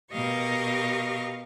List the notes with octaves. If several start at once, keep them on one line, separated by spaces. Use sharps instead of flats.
B2 G4 A#4 D#5 F5 C#6